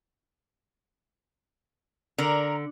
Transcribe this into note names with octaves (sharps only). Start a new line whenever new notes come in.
D3 A#4